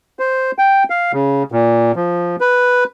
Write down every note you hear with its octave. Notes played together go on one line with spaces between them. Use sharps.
C5
G5
F5
C#3
A#2
F3
B4